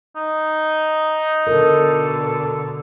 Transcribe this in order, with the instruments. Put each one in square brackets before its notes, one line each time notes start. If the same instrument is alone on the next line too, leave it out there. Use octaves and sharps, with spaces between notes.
[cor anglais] D#4
[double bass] B2 D3 [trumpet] A4 [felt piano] A#4